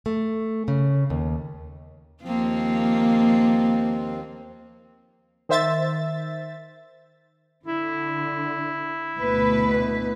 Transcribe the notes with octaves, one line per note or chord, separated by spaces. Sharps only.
A3
C#3
D#2
D#2 F3 A#3 C4
D#3 C5 E5 A6
D3 E4
D2 B2 B4